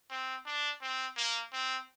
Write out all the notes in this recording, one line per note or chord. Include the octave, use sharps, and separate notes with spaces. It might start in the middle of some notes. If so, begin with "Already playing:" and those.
C4
D4
C4
A#3
C4